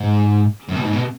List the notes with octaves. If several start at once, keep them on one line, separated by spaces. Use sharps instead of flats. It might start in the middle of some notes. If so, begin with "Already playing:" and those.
Already playing: G#2
F#2
B2
G#2
B2